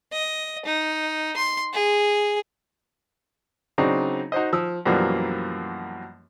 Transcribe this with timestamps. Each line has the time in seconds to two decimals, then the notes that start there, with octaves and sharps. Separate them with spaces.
0.12 D#5
0.65 D#4
1.37 C6
1.73 G#4
3.78 C#3 F#3 C4 D4 D#4
4.32 D#4 F#4 C5 D#5
4.53 F3 D#6 E6
4.86 F#2 B2 E3 F3 G3 A#3